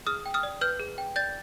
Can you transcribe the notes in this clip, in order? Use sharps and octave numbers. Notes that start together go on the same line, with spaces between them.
G#4 D#6 F6
G5
D#6 F6
D5
B4 F6 G6
G#4
G5
D5 G6 A6